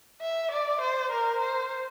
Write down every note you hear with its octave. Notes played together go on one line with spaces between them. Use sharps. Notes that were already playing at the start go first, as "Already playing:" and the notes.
E5
D5
C5
A#4
C5